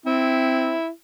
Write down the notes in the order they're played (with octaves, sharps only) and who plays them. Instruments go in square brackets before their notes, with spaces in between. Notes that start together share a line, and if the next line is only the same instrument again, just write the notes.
[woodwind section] C4 [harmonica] E4